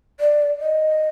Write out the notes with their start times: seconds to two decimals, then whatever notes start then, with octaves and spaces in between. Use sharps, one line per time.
0.20 D5
0.60 D#5